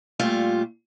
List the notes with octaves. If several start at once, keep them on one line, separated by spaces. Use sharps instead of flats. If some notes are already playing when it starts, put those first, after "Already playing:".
A#2 G3 A3 F4